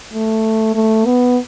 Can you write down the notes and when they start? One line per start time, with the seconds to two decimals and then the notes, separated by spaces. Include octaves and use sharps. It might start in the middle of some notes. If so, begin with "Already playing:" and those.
0.13 A3
0.75 A3
1.05 B3